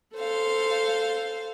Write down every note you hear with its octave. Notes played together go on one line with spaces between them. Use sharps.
A4 C5 F5